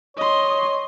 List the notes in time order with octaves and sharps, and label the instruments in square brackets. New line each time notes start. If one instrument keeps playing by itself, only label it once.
[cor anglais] C#5 [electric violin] D#5 C6